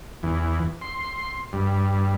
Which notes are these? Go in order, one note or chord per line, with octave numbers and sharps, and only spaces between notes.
E2
C6
G2